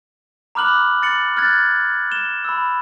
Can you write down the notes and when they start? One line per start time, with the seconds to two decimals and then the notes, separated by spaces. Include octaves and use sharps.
0.55 A#5 B5 D6 F6 F#6 F#7
1.02 A6 C#7 F#7
1.37 F6 F#6 G#6 A6
2.12 E7 G7
2.44 B5 E6